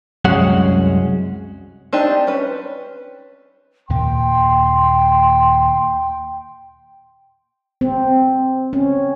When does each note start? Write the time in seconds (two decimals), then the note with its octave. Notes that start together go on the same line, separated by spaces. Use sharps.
0.25 C2 F#2 G#3 C#4 F#4 F#5
1.93 C4 D4 D#4 G4
2.27 C#4 B4
3.90 D#2 A#2 A#3 G5 C6
7.81 C4
8.73 C#4